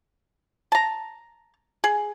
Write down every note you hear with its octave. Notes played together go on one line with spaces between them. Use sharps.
A5 A#5
G#4